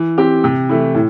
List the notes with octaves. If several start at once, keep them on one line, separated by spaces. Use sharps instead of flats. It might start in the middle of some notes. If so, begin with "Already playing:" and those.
Already playing: E3
C4 G4
C3
E3 A3 E4
A2